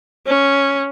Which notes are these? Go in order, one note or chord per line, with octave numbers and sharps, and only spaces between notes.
C#4